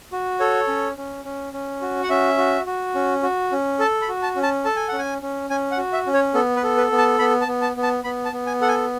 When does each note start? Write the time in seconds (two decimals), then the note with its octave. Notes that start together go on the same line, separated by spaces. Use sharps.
0.12 F#4
0.40 A4 C#5
0.68 C#4
0.97 C#4
1.25 C#4
1.53 C#4
1.81 F#4
2.03 F#5
2.10 C#4 E5
2.38 F#4
2.66 F#4
2.95 C#4
3.23 F#4
3.52 C#4
3.79 A4 A5
4.02 B5
4.08 F#4
4.22 A5
4.36 C#4
4.43 A5
4.65 A4 A5
4.76 G#5
4.88 C#4 F#5
4.99 G#5
5.22 C#4
5.50 C#4 G#5
5.71 F#5
5.77 F#4
5.93 E5
6.07 C#4
6.14 C#5
6.34 B3 A4
6.56 B4
6.63 A4
6.77 B4
6.91 B3
6.98 A5
7.19 B3 B5
7.41 A5
7.47 B3
7.62 A5
7.76 B3
7.83 A5
8.04 B3 B5
8.25 A5
8.33 B3
8.46 G#5
8.61 A4 F#5
8.68 G#5